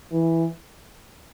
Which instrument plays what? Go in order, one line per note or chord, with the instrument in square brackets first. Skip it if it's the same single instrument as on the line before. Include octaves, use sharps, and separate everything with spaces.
[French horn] E3